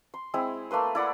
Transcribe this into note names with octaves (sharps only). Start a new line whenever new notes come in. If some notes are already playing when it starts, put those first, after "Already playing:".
C6
G#3 C4 E4
A3 A#3 B4 C6
E4 D5 F#5 B5